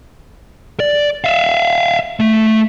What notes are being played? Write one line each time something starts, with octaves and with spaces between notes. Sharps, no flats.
D5
E5 F5
A3